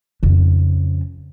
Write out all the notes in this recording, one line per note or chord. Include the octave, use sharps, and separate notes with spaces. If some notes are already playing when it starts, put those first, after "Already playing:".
F2 C#3